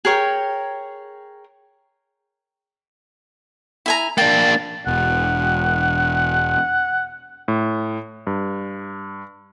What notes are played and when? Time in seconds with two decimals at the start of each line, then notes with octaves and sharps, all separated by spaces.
0.05 G#4 A#4 C#5 G5
3.86 E4 G#5 A#5
4.18 A#3 D4 G5 A6
4.87 E1 F#5
7.48 A2
8.27 G2